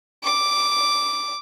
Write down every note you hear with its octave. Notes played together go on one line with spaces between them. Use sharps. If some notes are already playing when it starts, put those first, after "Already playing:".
D6